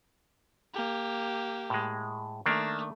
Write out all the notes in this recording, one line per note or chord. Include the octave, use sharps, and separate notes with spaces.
A#3 G4
A2 G#3
D#3 A3 A#3 D4